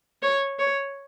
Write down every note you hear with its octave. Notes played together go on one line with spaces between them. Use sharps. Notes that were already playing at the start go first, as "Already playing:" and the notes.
C#5
C#5